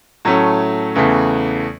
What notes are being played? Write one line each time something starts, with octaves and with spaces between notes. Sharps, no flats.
A2 F#3 A3 C#4
E2 C#3 E3 A3